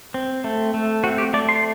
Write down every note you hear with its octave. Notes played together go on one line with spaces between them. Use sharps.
C4
A3
A3
C4 F#4
G4
A3 D5
C6